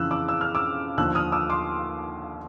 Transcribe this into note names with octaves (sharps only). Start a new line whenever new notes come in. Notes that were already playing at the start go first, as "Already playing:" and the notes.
Already playing: F2 C#3 E3 E6 F#6
D6 E6
E6
F6
D6 E6
D#2 D3 F3 E6 F#6
D#6 F6
D6 E6
C6 D6